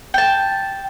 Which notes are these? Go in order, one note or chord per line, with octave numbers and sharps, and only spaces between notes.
G5 A5